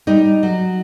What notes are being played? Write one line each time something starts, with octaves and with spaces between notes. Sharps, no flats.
G3 D#4
F#3